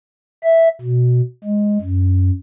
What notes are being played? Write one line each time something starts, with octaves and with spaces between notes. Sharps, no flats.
E5
B2
G#3
F#2